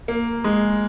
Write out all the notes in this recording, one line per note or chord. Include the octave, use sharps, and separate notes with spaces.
A#3
G#3